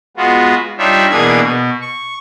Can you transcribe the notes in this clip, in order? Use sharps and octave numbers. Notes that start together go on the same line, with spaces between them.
G#3 B3 F4 F#4
G3 D4 D#4 F4 C#5 E5
B2 E3 A#3 D4 G#4 G#6
B2
C#6